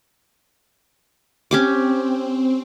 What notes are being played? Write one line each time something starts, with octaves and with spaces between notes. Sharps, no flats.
C4 C#4 G4 D6